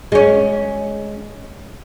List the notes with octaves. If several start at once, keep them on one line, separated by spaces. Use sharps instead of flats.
G#3 C#4